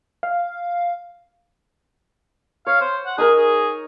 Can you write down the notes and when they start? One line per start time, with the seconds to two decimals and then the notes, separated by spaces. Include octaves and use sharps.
0.23 F5
2.67 C#5 F5
2.81 C5
3.06 F#5
3.18 D#4 G#4 A#4
3.37 G#4